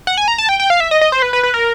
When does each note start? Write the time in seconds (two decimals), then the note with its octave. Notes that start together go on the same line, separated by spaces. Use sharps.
0.07 F#5
0.18 G#5
0.28 A#5
0.38 A5
0.49 G5
0.60 G5
0.70 F5
0.80 E5
0.91 D#5
1.01 D#5
1.12 C5
1.22 B4
1.33 B4
1.43 B4
1.54 A#4